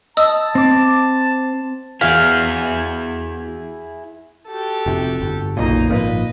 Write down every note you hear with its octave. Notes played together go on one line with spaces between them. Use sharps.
D#5 A5 D#6 E6
C4 D6
E2 E4 F#4 G#4 F5 B6
F#4 G4 A4
F1 C3
G1
F#1 B1 A#2 A#3 D#4 D#5
G#1 A#2 F3 B4 D#5